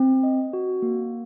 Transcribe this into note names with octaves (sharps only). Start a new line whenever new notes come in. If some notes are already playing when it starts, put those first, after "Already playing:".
Already playing: C4
D#5
F#4
A#3